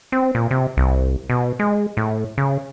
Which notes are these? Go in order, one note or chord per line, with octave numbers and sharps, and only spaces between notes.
C4
A#2
C3
C2
B2
G#3
A2
C#3